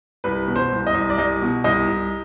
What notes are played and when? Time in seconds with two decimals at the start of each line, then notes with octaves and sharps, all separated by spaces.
0.24 C2 B4
0.48 B2
0.56 C5
0.72 C2
0.87 D#5
0.94 C2
1.10 D5
1.18 C2 D#5
1.42 B2
1.64 C2 D#5
1.88 C2